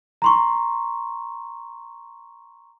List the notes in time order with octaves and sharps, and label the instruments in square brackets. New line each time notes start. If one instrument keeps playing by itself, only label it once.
[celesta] A#5 C6 C#6